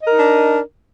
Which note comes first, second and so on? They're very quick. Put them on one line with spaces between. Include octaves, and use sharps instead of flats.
D#5 A#4 D#4 D4